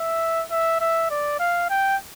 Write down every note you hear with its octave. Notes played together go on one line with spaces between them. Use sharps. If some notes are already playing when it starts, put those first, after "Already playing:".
Already playing: E5
E5
E5
D5
F5
G5